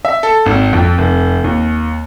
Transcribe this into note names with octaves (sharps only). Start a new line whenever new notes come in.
E5
A4
G#1
F2
F1
D#2